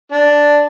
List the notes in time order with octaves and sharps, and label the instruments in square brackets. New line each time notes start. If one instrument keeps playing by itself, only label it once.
[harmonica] D4